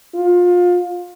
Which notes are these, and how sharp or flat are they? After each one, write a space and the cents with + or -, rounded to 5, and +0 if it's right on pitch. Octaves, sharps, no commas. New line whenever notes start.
F4 +25